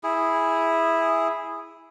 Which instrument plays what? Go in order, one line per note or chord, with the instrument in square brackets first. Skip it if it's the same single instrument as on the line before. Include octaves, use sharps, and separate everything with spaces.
[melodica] E4 G#4